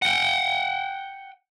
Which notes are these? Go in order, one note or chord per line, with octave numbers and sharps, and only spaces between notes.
F#5 G5